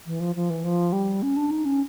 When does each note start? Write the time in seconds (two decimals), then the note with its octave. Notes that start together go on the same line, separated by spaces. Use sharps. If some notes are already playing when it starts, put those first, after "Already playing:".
0.06 E3
0.20 F3
0.35 F3
0.50 E3
0.64 F3
0.93 G3
1.23 C#4
1.37 D4
1.51 D#4
1.65 C#4